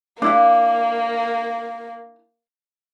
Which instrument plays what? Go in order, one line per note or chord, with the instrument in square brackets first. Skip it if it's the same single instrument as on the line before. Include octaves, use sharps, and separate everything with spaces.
[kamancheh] A#3 [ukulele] D4 E4 F5